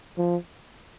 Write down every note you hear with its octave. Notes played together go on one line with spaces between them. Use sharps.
F3